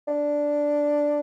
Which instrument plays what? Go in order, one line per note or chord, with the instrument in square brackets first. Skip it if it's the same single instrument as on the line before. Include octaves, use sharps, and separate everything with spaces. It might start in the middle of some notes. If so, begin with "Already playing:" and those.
[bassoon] D4